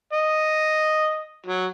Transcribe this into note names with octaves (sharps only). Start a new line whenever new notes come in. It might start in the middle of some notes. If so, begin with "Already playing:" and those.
D#5
F#3